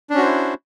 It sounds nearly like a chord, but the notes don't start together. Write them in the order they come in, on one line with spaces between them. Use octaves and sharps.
D4 C#4 F#4 C5 E4